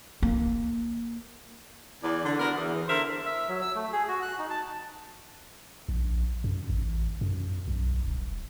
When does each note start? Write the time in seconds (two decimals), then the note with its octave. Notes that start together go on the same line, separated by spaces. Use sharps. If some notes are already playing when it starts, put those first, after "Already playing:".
0.23 A#3
2.03 E2 D5
2.25 D3
2.40 B3 F#4 A#4
2.56 E2
2.88 D3 A#4 C5 E5
3.26 E5
3.49 F#3
3.62 E6
3.75 A3
3.92 G#4
4.08 F#4
4.22 F#6
4.39 D#4
4.50 A5
5.89 A#1
6.44 F#2
6.69 A1
7.21 F#2
7.68 B1
8.08 D#1